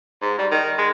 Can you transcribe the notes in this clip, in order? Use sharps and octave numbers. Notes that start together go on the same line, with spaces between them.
G#2
G3
D#3
G#3